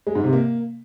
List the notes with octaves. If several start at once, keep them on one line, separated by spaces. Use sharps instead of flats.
G#3
G#2
C3
A#3